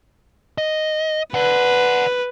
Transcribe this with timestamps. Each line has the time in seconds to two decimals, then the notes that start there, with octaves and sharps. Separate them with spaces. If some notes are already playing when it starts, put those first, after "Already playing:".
0.58 D#5
1.34 B4 D5 F#5